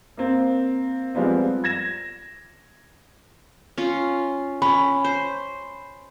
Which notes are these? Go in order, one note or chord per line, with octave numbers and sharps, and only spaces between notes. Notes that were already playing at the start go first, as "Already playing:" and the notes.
A#3 C4
F3 G3 G#3 B3 C4
G#6 A#6 E7
C#4 F4
C#4 B5
C5